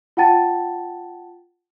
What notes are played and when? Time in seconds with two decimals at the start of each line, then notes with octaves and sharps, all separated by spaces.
0.17 F4 F#5 G5 A5 A6